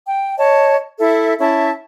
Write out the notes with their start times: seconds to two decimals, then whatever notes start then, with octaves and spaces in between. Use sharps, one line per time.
0.07 G5
0.38 C#5 D#5 A5
1.00 E4 A4 E5
1.40 C#4 E4 E5 A5